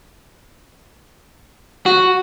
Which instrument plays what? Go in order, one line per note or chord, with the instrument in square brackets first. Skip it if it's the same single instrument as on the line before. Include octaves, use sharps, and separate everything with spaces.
[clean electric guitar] F#4